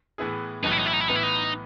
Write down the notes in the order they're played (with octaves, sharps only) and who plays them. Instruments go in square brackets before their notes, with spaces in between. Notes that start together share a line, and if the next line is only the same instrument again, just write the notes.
[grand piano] A2 E3 B3 E4 G#4
[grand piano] B1 A2 E3 B3 [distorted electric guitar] D#4
[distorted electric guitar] E4
D#4
E4
D#4
E4
[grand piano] A2 E3 B3 [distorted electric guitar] D#4
[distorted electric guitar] E4
D#4